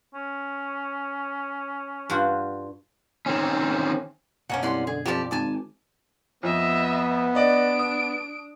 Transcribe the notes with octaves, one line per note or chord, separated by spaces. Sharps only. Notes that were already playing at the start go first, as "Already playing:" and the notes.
C#4
G2 F4 F#4
D#3 C4 C#4
F#2 B2 D3 A#3 C#4 F#5
C2 D5 F#5 C6
D3 G#4
F2 F3 G3 G4 D5 A5
G#1 G#5 A5 D6
F2 B3 D#5 E5
D4 D5 D#5 D7
D#6